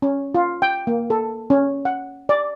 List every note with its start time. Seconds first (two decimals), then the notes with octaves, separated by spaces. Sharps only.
0.02 C#4
0.35 F4
0.62 G5
0.87 A#3
1.10 A4
1.50 C#4
1.85 F#5
2.29 D5